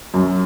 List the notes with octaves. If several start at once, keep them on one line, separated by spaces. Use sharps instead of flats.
F#2